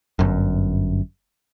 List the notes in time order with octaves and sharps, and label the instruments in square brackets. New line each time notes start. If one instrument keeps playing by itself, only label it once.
[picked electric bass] G1 F#2